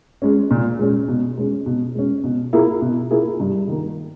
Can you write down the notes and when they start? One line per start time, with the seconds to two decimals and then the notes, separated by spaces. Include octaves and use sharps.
0.22 G#3 C#4
0.51 A#2
0.79 G#3 C#4
1.08 B2
1.37 G#3 C#4
1.66 B2
1.95 G#3 C#4
2.24 B2
2.53 A#3 E4 G#4
2.82 B2
3.11 A#3 E4 G#4
3.40 G2
3.68 D#3 A#3